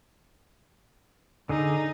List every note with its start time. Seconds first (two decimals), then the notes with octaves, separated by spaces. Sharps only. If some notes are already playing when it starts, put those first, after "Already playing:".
1.49 D3 D#4 G#4